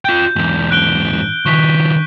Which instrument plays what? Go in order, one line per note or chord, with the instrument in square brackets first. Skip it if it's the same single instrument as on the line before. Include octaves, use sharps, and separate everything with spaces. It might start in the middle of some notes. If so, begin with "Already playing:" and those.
[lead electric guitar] F4 G5 [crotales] G6
[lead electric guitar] E2 G#2
[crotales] F#6 D7 G7
[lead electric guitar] D#3 F3 [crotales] C#6 B6